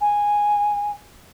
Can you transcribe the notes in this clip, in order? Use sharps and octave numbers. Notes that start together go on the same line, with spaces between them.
G#5